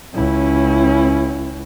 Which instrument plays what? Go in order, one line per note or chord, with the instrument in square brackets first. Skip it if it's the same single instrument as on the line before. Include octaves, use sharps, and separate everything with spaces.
[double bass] C#2 [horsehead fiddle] C#4 E4